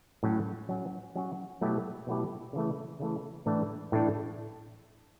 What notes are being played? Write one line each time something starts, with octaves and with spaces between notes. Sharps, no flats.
A2 F#3 C#4
F#3 C#4 F#4
F#3 C#4 F#4
B2 F#3 A3 E4 G4
B2 F#3 A3 E4 G4
C#3 E3 A3
C#3 E3 A3
A2 E3 A3 D4
A2 E3 A3 D4